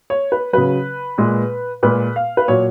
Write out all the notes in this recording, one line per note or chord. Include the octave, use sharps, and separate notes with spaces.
C#5
B4
C#3 F#3 B4
A#2 G#3
A#2 G#3 B4
F5
B4
A#2 F#3 C#5